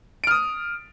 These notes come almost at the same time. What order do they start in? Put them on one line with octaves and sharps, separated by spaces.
D7 F6 D#6